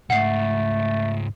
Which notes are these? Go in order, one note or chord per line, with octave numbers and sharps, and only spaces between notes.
C#2 G#2 A3 F#5 C7